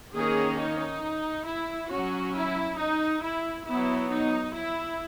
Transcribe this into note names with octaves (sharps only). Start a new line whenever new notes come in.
D#3 A#3 C#4 G#4
D#4
E4
F#3 C#4 F#4
E4
D#4
E4
F#3 B3 E4
D#4
E4